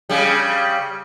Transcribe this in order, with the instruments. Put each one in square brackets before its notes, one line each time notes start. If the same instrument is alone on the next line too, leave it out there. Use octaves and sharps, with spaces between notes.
[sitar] C#3 G3